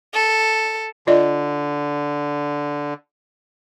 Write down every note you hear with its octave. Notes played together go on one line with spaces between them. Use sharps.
A4
D3 F4 D5 D#5